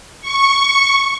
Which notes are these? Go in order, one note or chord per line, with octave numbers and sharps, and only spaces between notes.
C#6